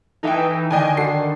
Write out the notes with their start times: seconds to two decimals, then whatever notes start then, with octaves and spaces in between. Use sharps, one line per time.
0.23 E3 D#4 A4 E5 G5
0.71 D3 D#3 D#5 G5 G#5
0.97 F#4 A4 C7